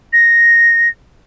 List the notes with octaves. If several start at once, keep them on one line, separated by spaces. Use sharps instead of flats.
A#6